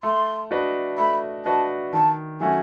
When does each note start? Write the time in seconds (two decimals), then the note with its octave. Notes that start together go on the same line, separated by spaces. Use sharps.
0.03 A3 C6
0.51 D4 F#4 B4 D#5
0.98 A3 B5
1.45 D4 F#4 B4 D#5 A5
1.93 D#3 A5
2.40 F#3 A3 C#4 F#4 G#5